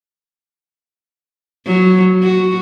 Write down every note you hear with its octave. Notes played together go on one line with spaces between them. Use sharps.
F#3
F#4